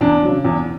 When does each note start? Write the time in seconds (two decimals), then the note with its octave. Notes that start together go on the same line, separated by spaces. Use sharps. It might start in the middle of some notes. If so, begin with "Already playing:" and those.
0.01 E2 D4
0.24 C#3 F#3
0.45 E2